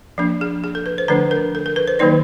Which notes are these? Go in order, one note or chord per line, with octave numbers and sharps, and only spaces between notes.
F3 A#3 D4
G#4
G#4
A4
B4
C5
D3 F3 A3 D4 B4
A#4
A4
A#4
B4
C5
D#3 F#3 A#3 D#4 D5